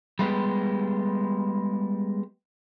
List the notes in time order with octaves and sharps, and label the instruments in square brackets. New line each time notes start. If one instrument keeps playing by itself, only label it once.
[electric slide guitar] G3 G#3 B3 G4